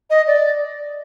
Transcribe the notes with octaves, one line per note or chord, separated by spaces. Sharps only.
D#5
D5